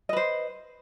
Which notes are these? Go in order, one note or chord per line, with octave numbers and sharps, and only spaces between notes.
B4 C5 D#5